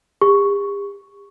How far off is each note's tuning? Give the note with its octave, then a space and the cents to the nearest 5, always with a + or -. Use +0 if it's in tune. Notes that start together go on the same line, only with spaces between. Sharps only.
G4 +45 C#6 +0